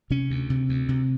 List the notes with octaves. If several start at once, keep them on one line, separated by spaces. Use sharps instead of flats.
C3 C#4
D2
C3
D2
C3